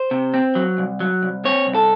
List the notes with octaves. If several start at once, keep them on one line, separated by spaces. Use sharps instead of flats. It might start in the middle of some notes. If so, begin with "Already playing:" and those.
Already playing: C5
C3
C4
F#3
C2
F#3
C2
C4 C#5
C2
A4